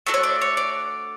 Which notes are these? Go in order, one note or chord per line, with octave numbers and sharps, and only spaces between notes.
A3 D4 F#4 A4
C#5
D5
C#5
D5